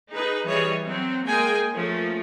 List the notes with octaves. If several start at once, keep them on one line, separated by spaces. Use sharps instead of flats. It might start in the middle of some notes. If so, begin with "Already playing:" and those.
D#4 G#4 B4
E3 G3 G#4 C#5 D#5
F#3 C4
G#3 A#3 G#4 G5 G#5
F3 A3 A#3 C#4